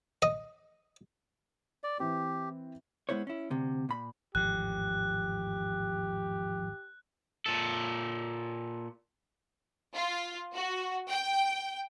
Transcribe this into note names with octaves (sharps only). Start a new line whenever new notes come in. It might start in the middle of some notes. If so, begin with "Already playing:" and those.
D#5
D5
E3 C4 G4
G#3 B3 E4 C5 C#5
C#4 E4
D2 C3
A#2 B5
G#1 E2 A2 F3 G4 F#6
A#2 A4
F4
F#4
G5